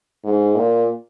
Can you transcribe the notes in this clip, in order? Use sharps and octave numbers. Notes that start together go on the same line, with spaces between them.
G#2
A#2